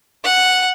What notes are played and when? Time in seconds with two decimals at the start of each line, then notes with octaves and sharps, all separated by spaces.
0.24 F#5